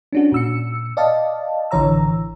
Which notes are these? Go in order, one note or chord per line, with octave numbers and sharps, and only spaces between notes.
C#4 D4 F#4
A#2 E6 C#7
D5 D#5 F5 A5
A1 D3 E3 C#5 A#5 E6